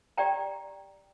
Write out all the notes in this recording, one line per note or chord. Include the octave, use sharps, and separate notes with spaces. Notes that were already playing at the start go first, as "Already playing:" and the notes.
G4 D5 G5 A#5